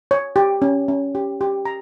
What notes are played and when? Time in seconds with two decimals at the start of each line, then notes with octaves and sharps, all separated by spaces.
0.11 C#5
0.36 G4
0.62 C#4
0.88 C#4
1.15 G4
1.41 G4
1.65 A#5